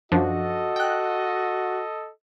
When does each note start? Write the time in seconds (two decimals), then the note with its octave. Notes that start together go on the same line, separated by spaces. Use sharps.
0.12 F#2 F3 D4 F#4 A4 D#5
0.76 G5 F#6